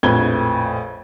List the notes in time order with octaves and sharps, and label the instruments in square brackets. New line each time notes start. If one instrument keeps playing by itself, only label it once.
[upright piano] A#1 F2 A2 B4 G#6 G7